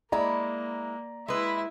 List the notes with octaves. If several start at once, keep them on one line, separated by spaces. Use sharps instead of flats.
G#3 A#3 E4 D5 A#5
G#3 E4 B4 E5